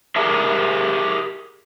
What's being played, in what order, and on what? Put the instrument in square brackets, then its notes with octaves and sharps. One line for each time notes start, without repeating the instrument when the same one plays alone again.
[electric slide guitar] G4 G#4 A#4 E5